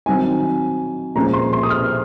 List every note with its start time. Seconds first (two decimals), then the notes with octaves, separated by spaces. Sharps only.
0.06 D#3 F#3 C4 D#4 G#5
1.15 A#2 F3 G#3 C#4 A#5
1.33 C6
1.53 C6
1.63 D#6
1.70 F6